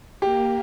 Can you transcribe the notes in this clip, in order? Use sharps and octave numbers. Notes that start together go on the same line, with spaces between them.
A#3 G4